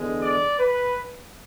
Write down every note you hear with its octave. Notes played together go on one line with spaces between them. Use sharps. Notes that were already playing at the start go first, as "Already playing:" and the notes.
Already playing: E2 D3 G#3
D5
B4